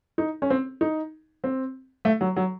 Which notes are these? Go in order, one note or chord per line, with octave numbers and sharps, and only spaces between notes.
D#4
C#4
C4
D#4
C4
A3
F#3
F#3